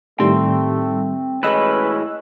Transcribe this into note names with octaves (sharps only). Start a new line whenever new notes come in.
A2 D#3 G3 A3 C4 C6
A2 E3 G#3 C#4 B4 D#5 E6 F#6